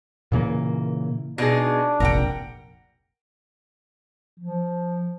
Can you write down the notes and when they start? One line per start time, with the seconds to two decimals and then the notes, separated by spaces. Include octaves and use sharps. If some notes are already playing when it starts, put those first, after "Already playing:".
0.32 A#2 C#3 E3 A#3
1.38 B2 D4 D#4 G#4
2.00 F1 A#1 A#4 F#5 G5
4.40 F3